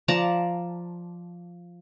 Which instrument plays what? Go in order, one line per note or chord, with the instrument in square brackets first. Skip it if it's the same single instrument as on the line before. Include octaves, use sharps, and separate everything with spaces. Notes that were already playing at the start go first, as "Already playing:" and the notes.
[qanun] F3 D5 A5 A#5